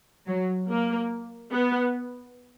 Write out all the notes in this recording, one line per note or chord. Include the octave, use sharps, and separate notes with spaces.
F#3
A#3
B3